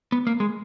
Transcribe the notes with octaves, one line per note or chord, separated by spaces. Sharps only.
B3
A#3
G#3